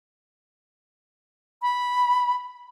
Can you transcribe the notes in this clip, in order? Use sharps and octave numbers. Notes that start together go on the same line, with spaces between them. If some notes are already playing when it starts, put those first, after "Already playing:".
B5